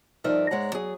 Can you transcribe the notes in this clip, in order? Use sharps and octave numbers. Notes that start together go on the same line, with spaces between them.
G2 F3 D#4 A#4 D5 E5
G#2 G#3 C#5 F#5 A#5
F#3 G#4